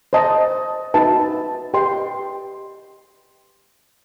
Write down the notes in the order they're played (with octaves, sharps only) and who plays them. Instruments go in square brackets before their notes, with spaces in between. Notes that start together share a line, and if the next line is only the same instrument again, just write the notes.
[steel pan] C5 D#5 A5
D#4 F#4 B4 E5 A5
G4 B4 D#5 G5 C6